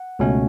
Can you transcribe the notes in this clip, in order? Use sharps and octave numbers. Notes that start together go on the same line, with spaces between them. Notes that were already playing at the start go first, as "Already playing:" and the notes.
Already playing: F#5
C#2 B2 A3 C#4